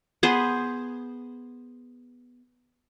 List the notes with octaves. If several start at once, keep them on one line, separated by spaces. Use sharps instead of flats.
B3 G#4 C5